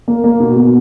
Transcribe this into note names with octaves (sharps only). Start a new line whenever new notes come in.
A#3
A#3
B2
B2